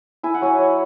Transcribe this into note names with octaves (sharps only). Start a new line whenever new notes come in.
E4 G#5
F#5
F#3 G#5
F#3